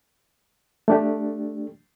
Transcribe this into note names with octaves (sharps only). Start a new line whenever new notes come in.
A3 D4 G4